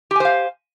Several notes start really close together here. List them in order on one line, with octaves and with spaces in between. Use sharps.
G4 G#5 C5 F5